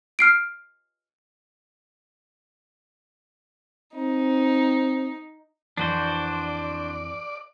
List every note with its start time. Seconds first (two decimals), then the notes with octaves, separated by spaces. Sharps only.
0.19 F6 C7 D7
3.95 C4 D#4
5.77 F2 E3 D4 F#4 C5 D5